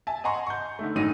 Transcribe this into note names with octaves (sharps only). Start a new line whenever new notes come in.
E5 G#5 A5
D#5 F#5 G#5 A#5 C6 C#6
C#6 G6
D3 D#3 A3
F#1 A2 F#3 D#4 D#7